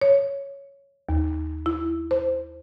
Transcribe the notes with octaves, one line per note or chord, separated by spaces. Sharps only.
C#5
D#2
E4
C5